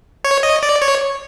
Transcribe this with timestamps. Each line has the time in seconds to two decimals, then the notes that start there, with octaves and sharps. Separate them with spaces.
0.24 C#5
0.43 D#5
0.63 D5
0.82 C#5